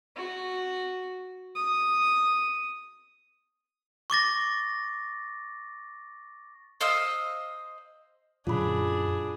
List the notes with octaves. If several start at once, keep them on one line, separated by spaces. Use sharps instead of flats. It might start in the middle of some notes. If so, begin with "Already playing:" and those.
F#4
D#6
C#6 D6 A6 A#6
C5 D#5 F5 E6
F#2 A#2 D3 F#3 D4 F4 G#4 B5